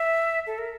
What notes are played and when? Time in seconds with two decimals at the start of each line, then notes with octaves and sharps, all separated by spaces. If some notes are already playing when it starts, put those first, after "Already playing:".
Already playing: E5
0.47 A4
0.58 A#4